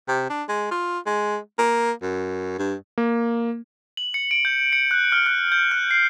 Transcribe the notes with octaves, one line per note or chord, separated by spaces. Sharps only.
C3
D4
G#3
F4
G#3
A#3
F#2
G2
A#3
F#7
C#7
D7
G6
C#7
F#6
F6
F#6
G6
F#6
C7